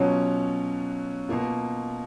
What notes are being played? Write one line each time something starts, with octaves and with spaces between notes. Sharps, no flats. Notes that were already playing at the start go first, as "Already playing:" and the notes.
Already playing: B2 F#3 C#4 F4
B2 A#3 F4